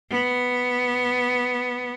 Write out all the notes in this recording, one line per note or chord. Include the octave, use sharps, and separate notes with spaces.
B3